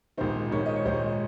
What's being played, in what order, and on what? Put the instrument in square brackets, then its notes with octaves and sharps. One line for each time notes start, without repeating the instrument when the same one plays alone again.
[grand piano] A#1 G#2 D#3 C5
A#1 G#2 D#3 C#5
D#5
C#5
A#1 G#2 D#3 C5